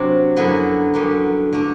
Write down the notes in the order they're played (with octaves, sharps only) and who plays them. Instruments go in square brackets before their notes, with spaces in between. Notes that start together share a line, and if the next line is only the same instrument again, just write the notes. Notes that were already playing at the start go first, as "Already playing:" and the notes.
Already playing: [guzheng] C3 F#3 C4 D4
F#2 D3 F#3 B3 E4
F#2 D3 G3 B3
D3 A3 D4